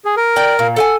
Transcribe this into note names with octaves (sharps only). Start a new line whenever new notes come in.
G#4
A#4
D5 G5
A#2
A4 F#5 G#5